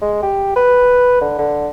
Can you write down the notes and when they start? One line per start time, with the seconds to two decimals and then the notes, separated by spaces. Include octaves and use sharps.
0.01 G#3
0.22 G4
0.56 B4
1.21 D3
1.39 D3